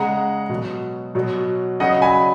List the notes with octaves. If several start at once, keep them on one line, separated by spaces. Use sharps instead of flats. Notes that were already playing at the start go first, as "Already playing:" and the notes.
Already playing: C#3 G#3 F#5 A#5
B2 F#3
B2 F#3
C#3 F#3 D#5 F#5
G#5 B5